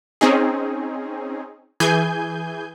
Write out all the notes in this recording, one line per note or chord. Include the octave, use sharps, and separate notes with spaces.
C4 C#4 D#4 G#4
E3 G#4 G#5 G6